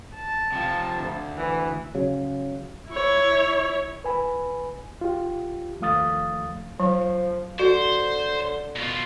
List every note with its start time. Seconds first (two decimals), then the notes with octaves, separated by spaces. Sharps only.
0.16 A5
0.52 C3 F3
0.98 D2
1.37 E3
1.94 C#3 F#3
2.90 E4 C#5
4.04 B4 G#5 B5
5.01 F4 G4
5.80 D#2 F3 A3 F5 D#6 A6
6.80 F3 F#3
7.59 D3 F#4 C5
8.76 B2 F4